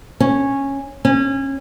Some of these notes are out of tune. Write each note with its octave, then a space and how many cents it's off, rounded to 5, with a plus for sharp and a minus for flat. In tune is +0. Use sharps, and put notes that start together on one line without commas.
C#4 -10
C#4 -25